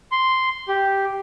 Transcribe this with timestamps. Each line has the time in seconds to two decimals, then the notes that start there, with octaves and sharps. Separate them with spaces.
0.12 C6
0.68 G4